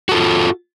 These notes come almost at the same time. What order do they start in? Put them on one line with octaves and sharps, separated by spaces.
F#4 A4 F4